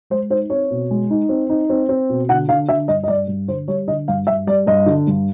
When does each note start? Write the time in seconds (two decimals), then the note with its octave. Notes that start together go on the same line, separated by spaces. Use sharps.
0.10 G#3 C5
0.30 D#4 C5
0.50 C4 C#5
0.71 B2
0.91 G#3
1.10 D#4
1.29 C4
1.50 D#4
1.70 C4
1.89 C4
2.10 B2
2.29 D3 F#5
2.48 D3 F5
2.69 D3 E5
2.88 G2 D#5
3.04 D#5
3.08 G2 D5
3.28 G2
3.48 D3 C5
3.68 G3 C#5
3.88 D3 D#5
4.08 G2 F5
4.27 G2 E5
4.47 G3 D5
4.67 G2 D#5
4.86 D3
5.07 G2